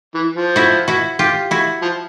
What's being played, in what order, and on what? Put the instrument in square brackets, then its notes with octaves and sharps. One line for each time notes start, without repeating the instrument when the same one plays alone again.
[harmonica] E3
F3
[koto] E4 F#4
E4 F#4
F4 G4
E4 F#4
[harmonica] F3